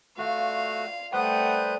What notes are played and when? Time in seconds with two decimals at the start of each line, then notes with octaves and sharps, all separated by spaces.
0.18 A3 F4 F#4 D5 F5
1.13 G3 A3 B4 C5 F#5 D#6 G6